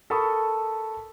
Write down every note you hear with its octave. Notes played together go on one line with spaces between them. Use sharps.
A4 A#4 A5 B5 C#6 D#6